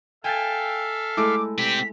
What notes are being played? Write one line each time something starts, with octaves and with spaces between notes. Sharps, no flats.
A4 E5 F5 G5 G#5 A6
G#3 A3 E4 D6
C4 G4 B6